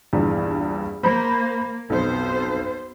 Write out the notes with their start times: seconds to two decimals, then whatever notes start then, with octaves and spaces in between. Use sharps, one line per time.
0.13 A#1 E2 G2
1.03 A#3 C5 A#5 B5
1.90 B1 F2 B3 C5